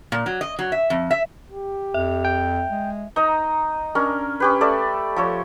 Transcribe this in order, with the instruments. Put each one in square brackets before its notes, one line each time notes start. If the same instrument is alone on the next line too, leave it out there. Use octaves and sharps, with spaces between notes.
[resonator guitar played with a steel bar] A#2
F#3
D#5
F#3
E5
F2
E5
[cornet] G4
[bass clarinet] F2 [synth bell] E5
[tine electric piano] G5
[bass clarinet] G#3
[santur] D#4 D#5 A#5
C#4 D4 A#4
C#4 G4 B4
A3 A4 D5
F3 A4 C#5